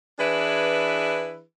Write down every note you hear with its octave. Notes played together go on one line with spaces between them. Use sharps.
E3 D4 E4 G#4 B4